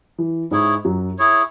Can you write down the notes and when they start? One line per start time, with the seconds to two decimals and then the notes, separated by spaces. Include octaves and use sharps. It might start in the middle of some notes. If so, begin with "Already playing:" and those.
0.18 E3
0.51 G#2 G#3 E4 G#4 C#5
0.85 F#2 F#3
1.18 E4 G#4 C#5